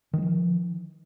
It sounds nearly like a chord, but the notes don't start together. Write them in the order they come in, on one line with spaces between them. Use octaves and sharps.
D#3 G3 F3